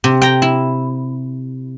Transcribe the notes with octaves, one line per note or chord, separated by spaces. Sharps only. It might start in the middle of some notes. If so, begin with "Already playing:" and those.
C3
G5 A#5
E4